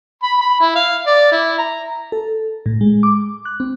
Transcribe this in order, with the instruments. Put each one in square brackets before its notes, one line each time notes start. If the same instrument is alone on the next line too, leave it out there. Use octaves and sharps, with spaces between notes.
[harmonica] B5
B5
E4
F5
D5
E4
A#5
[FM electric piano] A4
A2
G#3
D6
F#6
C4